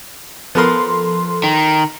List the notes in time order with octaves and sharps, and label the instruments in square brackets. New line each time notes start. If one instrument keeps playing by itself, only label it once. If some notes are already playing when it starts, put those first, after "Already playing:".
[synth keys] F3 A4 C6 [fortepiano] B3 A#4
[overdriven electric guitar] D#3